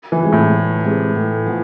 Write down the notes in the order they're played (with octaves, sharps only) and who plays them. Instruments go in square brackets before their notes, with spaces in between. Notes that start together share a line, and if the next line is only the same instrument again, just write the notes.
[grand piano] E3
[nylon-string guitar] C3 G#3
[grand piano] A2
[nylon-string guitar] D2
C3 G#3
A2
F3 B3